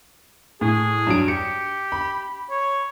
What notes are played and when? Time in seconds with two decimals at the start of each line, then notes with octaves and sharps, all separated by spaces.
0.61 A2 G#4
1.07 G2 F#3 D7
1.28 G4 C#7
1.92 B5
2.51 C#5